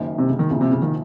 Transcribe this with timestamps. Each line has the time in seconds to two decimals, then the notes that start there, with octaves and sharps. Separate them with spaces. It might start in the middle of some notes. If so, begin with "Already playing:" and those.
Already playing: F#1 F#2 D#3 A#3
0.18 C3
0.29 C#3
0.39 D#3
0.50 C2 A#2 C#3 F3
0.61 C3
0.71 C#3
0.82 D#3